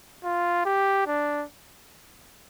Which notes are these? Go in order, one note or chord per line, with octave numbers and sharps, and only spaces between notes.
F4
G4
D4